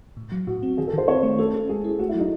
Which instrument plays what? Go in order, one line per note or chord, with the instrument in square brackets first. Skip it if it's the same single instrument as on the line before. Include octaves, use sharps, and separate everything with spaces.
[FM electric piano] A2
F#3
[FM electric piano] A2 [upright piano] F#4
[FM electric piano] C4
[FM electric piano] D#3 [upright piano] G#4
[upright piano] A4
[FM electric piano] D#3 [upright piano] C5
[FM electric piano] C4 [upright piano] C#5
[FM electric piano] A3
[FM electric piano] C#4 [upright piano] A4
[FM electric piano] C#4
[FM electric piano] G#3 [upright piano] G#4
[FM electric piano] E4
[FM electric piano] A3 [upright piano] F#4
[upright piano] E4
[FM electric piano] F#3 [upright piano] D#4